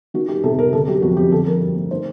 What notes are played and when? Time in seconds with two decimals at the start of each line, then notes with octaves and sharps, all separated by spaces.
0.14 D#3 F#4
0.28 G3 G4
0.44 C3 A4
0.58 C3 A#4
0.73 D3 A4
0.87 F#3 G4
1.02 F2 F#4
1.17 F2 G4
1.32 D3 A4
1.47 F3 A#4
1.61 G2
1.75 A3
1.91 D#3 C5